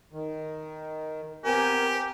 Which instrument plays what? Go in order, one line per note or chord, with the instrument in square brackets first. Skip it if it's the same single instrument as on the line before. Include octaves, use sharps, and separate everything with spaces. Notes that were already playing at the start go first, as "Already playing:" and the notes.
[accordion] D#3
[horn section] B3 C4 G#5 [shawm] G4 [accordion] A#4